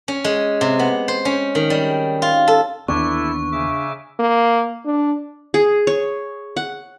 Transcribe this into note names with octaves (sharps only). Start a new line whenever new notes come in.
C#4
G#3
C3
B3
C5
C#4
D#3
G3
F4
A4
D#2 E3 B3 D4 E4 A4 C#6
C#3 E5 D6
A#3
D4
G#4
C#5
F#5